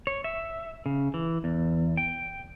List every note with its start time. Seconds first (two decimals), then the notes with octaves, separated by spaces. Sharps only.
0.07 C#5
0.24 E5
0.86 C#3
1.14 E3
1.44 E2
1.97 G5